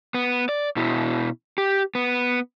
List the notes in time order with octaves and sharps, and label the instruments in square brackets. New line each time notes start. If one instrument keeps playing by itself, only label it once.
[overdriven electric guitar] B3
D5
B2 E4
G4
B3